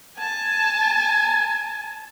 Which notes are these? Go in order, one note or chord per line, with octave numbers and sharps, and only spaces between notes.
G#5 A5